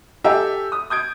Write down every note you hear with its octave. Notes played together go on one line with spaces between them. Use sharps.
G4 A4 E5 G5 G#5
D#6
D#6 G6 G#6 D7